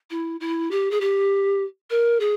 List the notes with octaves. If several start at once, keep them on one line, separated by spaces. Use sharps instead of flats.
E4
E4
G4
G#4
G4
A#4
G#4